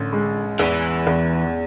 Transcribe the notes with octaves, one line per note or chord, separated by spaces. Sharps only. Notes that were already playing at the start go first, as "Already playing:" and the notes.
Already playing: A1 D3
G#3
E2 E3
E2